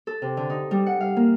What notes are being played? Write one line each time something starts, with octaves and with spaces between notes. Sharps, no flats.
A4
C3
D3
D#4
G3
F#5
F5
A#3